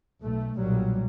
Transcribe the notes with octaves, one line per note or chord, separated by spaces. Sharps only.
B1 A3
B1 A#2 F#3 G3